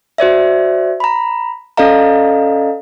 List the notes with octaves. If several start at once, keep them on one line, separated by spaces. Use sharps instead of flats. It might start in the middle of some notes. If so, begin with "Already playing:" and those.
F#4 C5 D5 E5
A#5 B5
C#4 A4 D5 D#5 F5 A#5